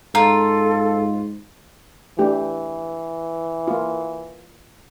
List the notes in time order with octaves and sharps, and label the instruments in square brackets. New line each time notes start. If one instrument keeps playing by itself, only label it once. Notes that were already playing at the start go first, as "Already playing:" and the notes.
[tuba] G#2 [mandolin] F4 [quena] A4 [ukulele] A#5
[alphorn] E3 [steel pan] A3 D4 G4
[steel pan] A#3 F4